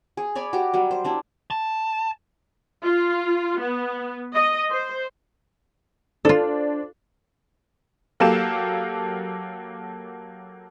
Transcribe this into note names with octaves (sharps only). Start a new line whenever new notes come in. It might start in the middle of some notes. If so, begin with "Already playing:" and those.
G#4
C#5 D5 G#5 B5
F#4 G4
F#3 G3
C5
G3 D4 E4
A5
F4
B3
D#5
C5
D4 F4 A4 C5 D5
F#3 A#3 G4 A4 F5 E7